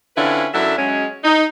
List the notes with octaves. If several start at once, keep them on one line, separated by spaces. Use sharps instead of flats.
D3 C4 C#4 E4 F4 B4
F#2 F#3 D4 E4 A4 E5
F#3 G#3 C#4
D#4